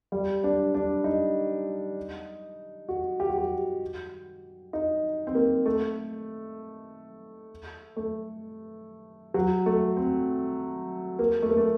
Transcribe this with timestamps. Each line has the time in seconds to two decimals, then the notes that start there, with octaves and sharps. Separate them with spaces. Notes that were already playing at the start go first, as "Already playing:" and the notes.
0.12 G3
0.44 D4
0.74 D4
1.04 D#4
2.89 F#4
3.20 G4
3.29 F#4
3.38 G4
4.73 D#4
5.27 C4
5.35 A#3
5.66 A3
7.97 A3
9.34 F#3
9.66 A3
9.97 C4
11.19 A#3
11.42 A3
11.50 A#3
11.57 A3